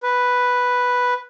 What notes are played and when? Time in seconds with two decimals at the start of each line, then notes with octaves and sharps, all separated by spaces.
0.03 B4